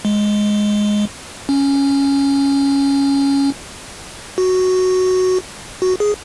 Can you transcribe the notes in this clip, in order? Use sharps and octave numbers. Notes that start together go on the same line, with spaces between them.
G#3
C#4
F#4
F#4
G#4